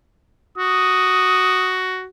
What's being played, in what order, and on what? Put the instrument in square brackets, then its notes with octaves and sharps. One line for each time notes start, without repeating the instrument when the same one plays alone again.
[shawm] F#4 [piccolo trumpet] D#6